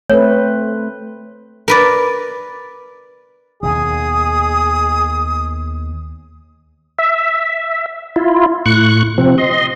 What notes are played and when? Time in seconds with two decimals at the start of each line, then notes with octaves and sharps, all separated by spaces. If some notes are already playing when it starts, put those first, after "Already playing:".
0.10 A3 C4 B4 C#5
1.68 A#4 B4 D5
3.63 D#2 B2 D#3 G#4 D#6
6.99 E5
8.16 E4 F4
8.66 A2 C#6 F#6
9.18 C3 F3 C4
9.38 D#5 C6